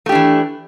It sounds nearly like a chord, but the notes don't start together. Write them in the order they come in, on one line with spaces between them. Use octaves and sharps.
A3 G4 D4 E3